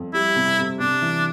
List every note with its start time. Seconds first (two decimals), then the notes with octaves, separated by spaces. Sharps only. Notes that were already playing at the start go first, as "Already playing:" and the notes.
Already playing: F2
0.14 G3 E4
0.36 C3
0.58 C3
0.80 C3 D4
1.02 E3